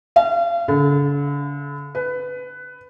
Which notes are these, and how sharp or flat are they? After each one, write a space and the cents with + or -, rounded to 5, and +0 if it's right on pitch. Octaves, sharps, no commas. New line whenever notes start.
F5 -35
D3 -45
B4 +15